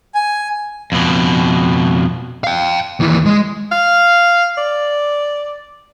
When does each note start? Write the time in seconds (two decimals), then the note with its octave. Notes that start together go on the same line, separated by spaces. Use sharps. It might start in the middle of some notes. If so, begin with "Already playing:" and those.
0.15 G#5
0.92 F2 B2
2.44 F5 G5
3.00 D#2 E3
3.26 G#3
3.72 F5
4.58 D5